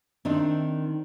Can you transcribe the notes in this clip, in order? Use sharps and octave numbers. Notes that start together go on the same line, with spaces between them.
D#3 C4 D4 D#4